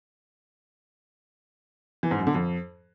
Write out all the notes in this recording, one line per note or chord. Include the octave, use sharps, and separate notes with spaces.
E3
G#2
F#2
D3
F2